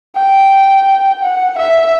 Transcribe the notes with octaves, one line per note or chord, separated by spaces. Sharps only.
G5
F#5
E5